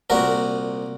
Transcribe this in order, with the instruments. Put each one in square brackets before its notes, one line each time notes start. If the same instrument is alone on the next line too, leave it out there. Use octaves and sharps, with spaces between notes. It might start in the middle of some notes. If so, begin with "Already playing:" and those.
[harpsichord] C2 A#2 F#4 A#4